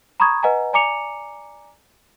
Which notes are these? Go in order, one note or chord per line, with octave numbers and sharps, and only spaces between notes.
A#5 B5 C#6 D#6 G#6
B4 D#5 F#5 G#5 A#5
D5 G#5 A#5 D6 C#7 F7